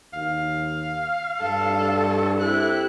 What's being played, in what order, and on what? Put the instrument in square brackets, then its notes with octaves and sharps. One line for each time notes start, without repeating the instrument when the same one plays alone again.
[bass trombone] D#2 [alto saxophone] F5
[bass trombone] G2 [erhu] A4
[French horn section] C4 E4 G4 [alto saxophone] A4 [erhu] F#6